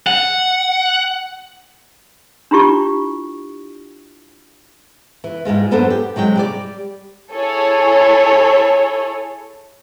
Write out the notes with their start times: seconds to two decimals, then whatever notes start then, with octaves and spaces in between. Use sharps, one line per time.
0.07 F#5
2.51 D4 E4 F4 G4 C#6
5.24 E3
5.45 G#2 G3 G#3 F4
5.71 F#2 B3 D4 A4 C5 F#5
5.90 G4
6.16 C3 F#3 G#3 G5
6.36 G3 G4 D5
7.34 E4 G#4 A4 C#5